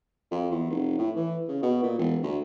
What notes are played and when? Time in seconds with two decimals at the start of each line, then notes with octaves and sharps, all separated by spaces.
0.31 F2
0.51 E2
0.70 F1
0.98 A2
1.16 E3
1.48 C#3
1.63 B2
1.83 A#2
1.98 E1
2.23 D2